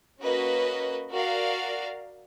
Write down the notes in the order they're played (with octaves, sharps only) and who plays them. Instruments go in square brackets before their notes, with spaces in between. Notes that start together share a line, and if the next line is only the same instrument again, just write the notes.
[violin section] A#3 C#4 F#4 B4 D#5
F#4 A#4 D5 F5